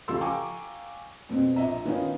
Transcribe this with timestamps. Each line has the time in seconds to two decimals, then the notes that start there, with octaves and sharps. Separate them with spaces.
0.08 C#2 F3 G4 A4 C6 E6
0.21 F5 G5 G#5 A#5 C#6 D6
1.29 F2 B2 C4
1.56 A#1 D#5 E5 A#5
1.85 D#3 B3 C#4 D#4 F4